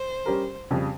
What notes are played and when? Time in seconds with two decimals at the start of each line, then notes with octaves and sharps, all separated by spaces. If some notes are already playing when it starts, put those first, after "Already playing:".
Already playing: C5
0.26 G3 C#4 G4 A#4
0.71 F2 C#3 G3